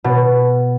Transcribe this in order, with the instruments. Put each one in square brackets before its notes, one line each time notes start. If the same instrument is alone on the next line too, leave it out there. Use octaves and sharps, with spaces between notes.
[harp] B2